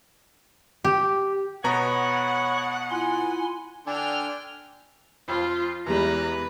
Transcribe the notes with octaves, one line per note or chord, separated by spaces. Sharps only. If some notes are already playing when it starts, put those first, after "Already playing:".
G4
B2 B3 C#5 F#5 A#5 B5 C#6
E4 F4 G#5 C6
D3 D4 G5 G#5 F6
F2 F3 F4
E2 E3 G3 G#3 B4 A#5